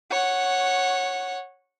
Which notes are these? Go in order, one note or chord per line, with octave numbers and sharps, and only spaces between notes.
C#5 F#5